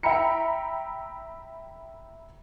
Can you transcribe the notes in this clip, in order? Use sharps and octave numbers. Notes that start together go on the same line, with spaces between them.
E5 G5 A#5 B5 C#7